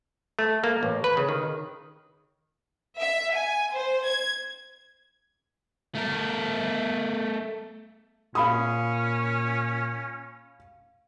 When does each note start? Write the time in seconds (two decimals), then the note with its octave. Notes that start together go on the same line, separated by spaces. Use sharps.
0.39 A3
0.64 A#3
0.83 A1
1.04 B4
1.17 C#3
1.29 D#3
3.00 E5
3.33 G#5
3.75 C5
4.06 G#6
5.95 A3 A#4
8.35 A#2 C#4 F5 B5 D#6